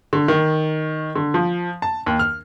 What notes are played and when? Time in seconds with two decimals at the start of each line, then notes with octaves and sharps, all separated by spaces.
0.13 D3
0.28 D#3
1.16 D3
1.34 F3
1.82 A5
2.06 D#2
2.19 F6